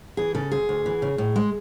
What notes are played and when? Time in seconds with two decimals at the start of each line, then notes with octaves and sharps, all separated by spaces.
0.17 E3 G#4
0.35 C#3 A4
0.52 D2 G#4
0.69 D2
0.86 E3
1.02 C#3
1.18 A2
1.36 G#3